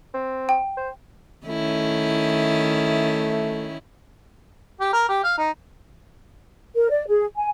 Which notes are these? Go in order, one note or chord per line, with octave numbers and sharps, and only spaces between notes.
C4
G5
C5
D#3 A3 C#4 E4
G4
A#4
G4
F5
D#4
A#4
D5
G#4
G#5